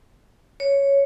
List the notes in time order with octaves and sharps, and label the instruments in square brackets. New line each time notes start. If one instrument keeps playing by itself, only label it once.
[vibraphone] C#5